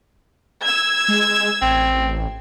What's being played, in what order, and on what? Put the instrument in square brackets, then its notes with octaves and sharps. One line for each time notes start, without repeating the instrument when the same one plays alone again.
[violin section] E6 G#6
[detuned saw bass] G#3
[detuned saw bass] A1 [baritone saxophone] C4